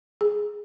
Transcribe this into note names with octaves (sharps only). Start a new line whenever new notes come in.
G#4